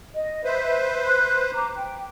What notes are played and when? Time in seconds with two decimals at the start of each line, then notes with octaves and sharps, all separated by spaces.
0.13 D#5
0.44 B4 C5 E5
1.06 C6 F#6
1.53 A#5 D6
1.76 G5